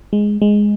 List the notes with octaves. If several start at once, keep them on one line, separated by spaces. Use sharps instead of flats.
G#3
G#3